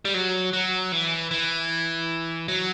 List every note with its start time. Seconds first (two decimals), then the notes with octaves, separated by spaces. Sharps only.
0.05 G3
0.14 F#3
0.53 F#3
0.92 E3
1.31 E3
2.48 F#3